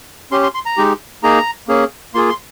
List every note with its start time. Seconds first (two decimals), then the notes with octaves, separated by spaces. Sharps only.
0.31 C#4 G4 C6
0.43 C6
0.54 C6
0.66 A#5
0.77 G#3 D#4 G4
1.23 A#3 D#4 G#4 A#5
1.68 A#3 C#4 G#4
2.14 A#3 F4 G#4 C6
2.29 C6